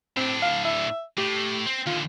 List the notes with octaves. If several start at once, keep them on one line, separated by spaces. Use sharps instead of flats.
A2 C4 D4
F5
E5
A2 G4
C4
D#2 D3 F4